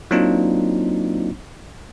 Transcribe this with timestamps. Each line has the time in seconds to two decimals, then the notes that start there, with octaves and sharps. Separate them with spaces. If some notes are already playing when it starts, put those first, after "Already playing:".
0.11 F#3 A#3 C4 D4 D#4 F4